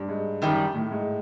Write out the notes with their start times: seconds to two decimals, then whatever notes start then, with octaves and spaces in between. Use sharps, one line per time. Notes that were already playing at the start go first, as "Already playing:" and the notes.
Already playing: G2
0.08 G#2
0.42 F#2 D#3 G3
0.75 A2
0.91 G#2